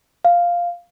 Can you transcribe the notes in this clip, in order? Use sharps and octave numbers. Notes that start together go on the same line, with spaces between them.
F5